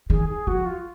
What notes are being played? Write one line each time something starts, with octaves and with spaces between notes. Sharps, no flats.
D#3 G#4
G#4
F3 F#4
F4